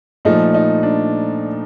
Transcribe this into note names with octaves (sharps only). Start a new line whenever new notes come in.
A#2 F3 A3 D#4
D#4
D4